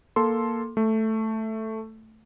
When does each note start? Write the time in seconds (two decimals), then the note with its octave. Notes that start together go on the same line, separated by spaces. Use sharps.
0.16 A#3 A4 C6
0.77 A3